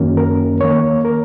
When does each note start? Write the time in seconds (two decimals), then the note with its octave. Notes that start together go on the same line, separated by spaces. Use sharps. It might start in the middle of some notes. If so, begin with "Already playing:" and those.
Already playing: F#2 D#3 F#3 A#3 C#4
0.17 A#4
0.61 D#2 D#3 A#3 C#5
1.05 A#4